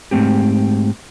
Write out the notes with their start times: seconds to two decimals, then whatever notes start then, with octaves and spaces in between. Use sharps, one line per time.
0.11 G#2 C#3 A3 C4 G4